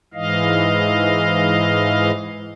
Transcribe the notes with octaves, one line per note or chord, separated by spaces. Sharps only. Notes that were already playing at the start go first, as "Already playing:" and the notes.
G#2 E3 D#5 F5